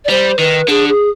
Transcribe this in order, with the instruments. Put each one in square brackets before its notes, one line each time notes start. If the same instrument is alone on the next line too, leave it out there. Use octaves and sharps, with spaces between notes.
[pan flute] D5
[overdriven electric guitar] G3 [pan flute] C5
[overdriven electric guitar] D#3 [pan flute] B4
[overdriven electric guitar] D3 [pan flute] G#4
[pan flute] G#4